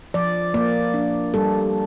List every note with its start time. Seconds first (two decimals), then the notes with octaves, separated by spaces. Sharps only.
0.14 F3 D5
0.54 A#3 D5
0.94 D4
1.34 G3 A4